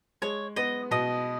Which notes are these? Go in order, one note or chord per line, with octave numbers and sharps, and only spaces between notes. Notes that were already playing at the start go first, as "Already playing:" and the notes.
G#3 C#5
B3 D#5
B2 D#5